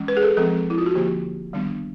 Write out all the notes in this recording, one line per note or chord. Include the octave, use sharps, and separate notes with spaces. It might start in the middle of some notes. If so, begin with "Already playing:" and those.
Already playing: E3 G#3 C#4
B4
G#4
A4
F3 G#3 C4 A4
E4
F4
F#4
D3 F3 A#3 G4
D#3 G3 B3 D4